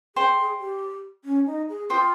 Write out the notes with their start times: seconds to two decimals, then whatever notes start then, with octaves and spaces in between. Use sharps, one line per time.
0.16 G#4 C5 G5 C6
0.59 G4
1.25 C#4
1.47 D#4
1.69 G#4
1.90 F4 C5 G5 C6 D#6